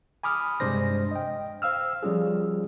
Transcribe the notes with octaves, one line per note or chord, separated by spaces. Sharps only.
G#5 B5 D6 D#6 F6
G2 C3 G#3 D4 C5 A#6
D#5 G5
C5 F5 E6 F6
F3 G3 C#4 F4 G#4